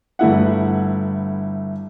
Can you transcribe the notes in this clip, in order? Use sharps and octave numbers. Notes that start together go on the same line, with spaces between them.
G1 A3 E4 F#5